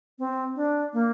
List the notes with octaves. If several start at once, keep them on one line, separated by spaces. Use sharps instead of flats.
C4
D4
A#3